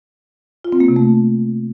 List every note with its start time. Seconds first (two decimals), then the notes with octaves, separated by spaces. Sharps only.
0.65 F4
0.72 C4
0.80 A#3
0.88 C3
0.96 A3